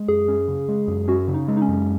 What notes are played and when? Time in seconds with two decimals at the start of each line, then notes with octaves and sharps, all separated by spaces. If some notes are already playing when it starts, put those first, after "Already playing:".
Already playing: G#3
0.08 F#2 G#4
0.28 C#4
0.48 C#3
0.68 G#3
0.88 F#2
1.08 C#4 F#4
1.28 C#3
1.34 D#4
1.48 G#3
1.57 D#4
1.62 C#4
1.69 F#2